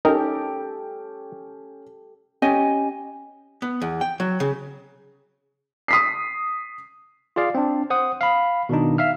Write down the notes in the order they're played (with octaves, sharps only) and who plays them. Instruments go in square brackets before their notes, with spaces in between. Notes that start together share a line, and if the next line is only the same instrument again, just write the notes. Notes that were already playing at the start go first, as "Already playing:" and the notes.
[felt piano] C#4 G5 [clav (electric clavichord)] D#4 [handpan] G4 A4 [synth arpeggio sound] A#4
[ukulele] C#4 G4 D#5 G#5
[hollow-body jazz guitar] B3
E2
G5
F#3
C#3
[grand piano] D#6 B6 C7
[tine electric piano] F4 G#4 D5 F5
C4 D4
C5 F#5 D#6
F5 B5
B2 D#3 D4 D#4
E5 F5 F6